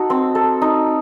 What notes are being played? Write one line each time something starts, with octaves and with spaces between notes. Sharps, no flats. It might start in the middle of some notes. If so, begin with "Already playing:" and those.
Already playing: D#4 F#4 A4
C4
A4
D#4